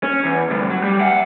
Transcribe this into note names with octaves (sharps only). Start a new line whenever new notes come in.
C#4
E2
D2 G2
F#3
G3
E5 F#5